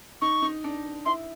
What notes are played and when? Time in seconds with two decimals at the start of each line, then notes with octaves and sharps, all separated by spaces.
0.22 D#4 C#6
0.42 D#4
0.64 D4
1.06 E4 C6